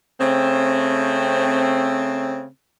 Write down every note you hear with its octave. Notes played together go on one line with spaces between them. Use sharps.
C#3 A3 C4